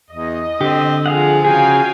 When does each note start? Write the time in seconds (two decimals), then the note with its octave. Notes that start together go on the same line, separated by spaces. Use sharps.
0.11 E2 D#5
0.61 D3 C4 G4
1.06 F3 G#4 F5 F#5
1.45 C#3 F#4 G#4 F5 G5 G#5